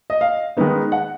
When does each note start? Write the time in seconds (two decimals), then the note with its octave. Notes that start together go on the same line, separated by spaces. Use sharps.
0.10 D#5
0.21 F5
0.57 D#3 G#3 B3 D#4
0.92 F#5